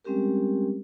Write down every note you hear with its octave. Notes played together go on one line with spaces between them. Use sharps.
G3 G#3 C4 C#4 G4 A#4